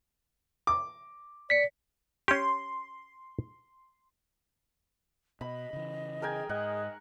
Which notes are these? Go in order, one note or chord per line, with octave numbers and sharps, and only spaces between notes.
D6
D5 B6 C#7
C#4 G4 C6
B2 D#5 B5
C#3 E3
G#4 A#4 G5 G#5
G#2 G#4 D#5 F#5